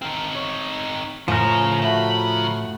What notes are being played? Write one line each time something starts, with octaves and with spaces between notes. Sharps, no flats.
C4 D#4 A#4
C#5
A2 C#3 F3 A#4
C#3 A3 F#4 B5